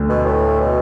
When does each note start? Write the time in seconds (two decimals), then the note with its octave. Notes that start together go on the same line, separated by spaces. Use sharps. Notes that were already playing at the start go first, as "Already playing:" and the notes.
Already playing: D2 D3 A3
0.09 B2
0.26 A2
0.60 B2